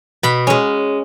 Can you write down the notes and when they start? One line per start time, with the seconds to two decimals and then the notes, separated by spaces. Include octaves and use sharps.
0.23 B2 B5
0.47 G#3 C#4